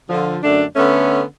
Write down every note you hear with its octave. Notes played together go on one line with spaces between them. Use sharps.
D3 F3
F#2 D3 A3 D4
D3 A3 B3 C#4